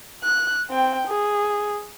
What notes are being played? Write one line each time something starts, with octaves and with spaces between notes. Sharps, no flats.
F#6
C4 G5
G#4